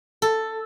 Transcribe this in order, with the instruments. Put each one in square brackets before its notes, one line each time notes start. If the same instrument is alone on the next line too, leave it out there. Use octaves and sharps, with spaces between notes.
[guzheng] A4